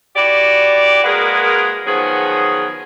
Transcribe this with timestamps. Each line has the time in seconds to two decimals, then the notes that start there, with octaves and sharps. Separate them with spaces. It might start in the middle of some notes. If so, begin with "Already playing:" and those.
0.16 E4 F#4 G4 D5
1.04 G#3 A#3 F#4 G#4 A#4 B4
1.86 D#3 F3 F#3 B3 G#4